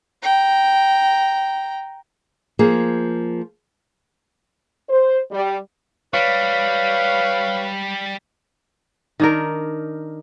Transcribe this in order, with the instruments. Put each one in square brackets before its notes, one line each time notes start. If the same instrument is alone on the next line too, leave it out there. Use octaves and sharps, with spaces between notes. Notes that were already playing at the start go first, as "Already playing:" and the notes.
[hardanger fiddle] G5 A#5
[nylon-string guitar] F3 A#3 G#4
[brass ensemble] C5
G3
[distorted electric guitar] G3 [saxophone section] B4 C#5 F5
[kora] D#3 D4 A#4